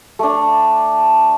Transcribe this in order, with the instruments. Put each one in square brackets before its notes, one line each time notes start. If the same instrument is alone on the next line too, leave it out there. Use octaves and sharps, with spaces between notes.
[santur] A3 D4